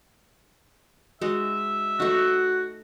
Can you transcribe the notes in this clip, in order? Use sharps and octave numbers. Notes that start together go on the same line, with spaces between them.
G#3 D#4 F#4 E5
A3 D#4 F#4